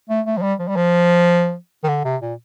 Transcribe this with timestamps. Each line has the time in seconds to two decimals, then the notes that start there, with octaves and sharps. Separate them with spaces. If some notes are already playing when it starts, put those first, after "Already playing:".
0.10 A3
0.26 A3
0.38 F3
0.42 G3
0.60 F3
0.68 G3
0.76 F3
1.84 D#3
1.89 D3
2.05 C3
2.22 A#2